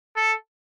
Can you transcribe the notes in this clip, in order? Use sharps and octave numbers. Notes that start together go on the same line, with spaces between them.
A4